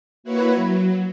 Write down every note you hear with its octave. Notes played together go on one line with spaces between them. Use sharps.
A#3 E4 F#4 B4 C#5
F#3